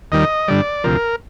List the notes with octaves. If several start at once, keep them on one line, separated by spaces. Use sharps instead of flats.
D#2 D#3 G3 D#5
G2 D3 G3 D5
D2 C3 F3 A#4